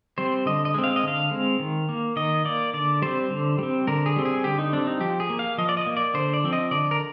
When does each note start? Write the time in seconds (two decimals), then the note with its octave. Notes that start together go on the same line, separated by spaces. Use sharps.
0.18 G3 C4 C5
0.46 D3 D#5
0.65 D#5
0.74 G#3 C4
0.84 F5
0.96 D#5
1.03 D3 F5
1.31 G#3 C4
1.60 D#3
1.89 A#3
2.16 D#3 D#5
2.45 A#3 D5
2.73 D3 D5
3.02 G3 C4 C5
3.30 D3
3.58 G3 C4
3.87 D3 A#4
4.06 G#4
4.16 G3 C4
4.25 G#4
4.44 D3 G4
4.59 D#4
4.73 G3 C4 D4
4.87 D#4
5.01 F3 G4
5.20 G#4
5.29 A#3
5.39 F5
5.58 F3 D#5
5.69 D5
5.77 D#5
5.86 A#3
5.97 D5
6.14 D3 C5
6.34 D5
6.44 F3 C4
6.53 D#5
6.71 D3 D5
6.91 A#4